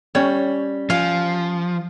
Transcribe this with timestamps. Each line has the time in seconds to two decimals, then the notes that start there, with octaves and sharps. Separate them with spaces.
0.15 G3 C#4 C#5
0.90 F3 F5 G#5